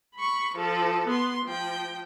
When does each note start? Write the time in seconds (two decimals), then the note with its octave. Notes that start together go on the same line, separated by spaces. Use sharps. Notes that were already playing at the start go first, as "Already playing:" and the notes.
0.15 B5 C#6
0.55 F3 A4
1.07 B3 C6
1.45 F3 G5